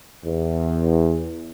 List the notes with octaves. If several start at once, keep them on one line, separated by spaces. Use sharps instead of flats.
E2